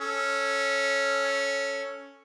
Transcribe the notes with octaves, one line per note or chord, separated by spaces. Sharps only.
C#4 A4